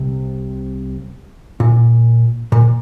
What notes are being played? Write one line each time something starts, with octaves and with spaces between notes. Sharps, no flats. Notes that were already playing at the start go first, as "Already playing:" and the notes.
Already playing: C2 C3
A#2
A#2